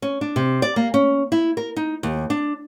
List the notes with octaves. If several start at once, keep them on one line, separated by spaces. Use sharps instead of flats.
C#4
D4
C3
D5
A#3
C#4
E4
A#4
D#4
D#2
D4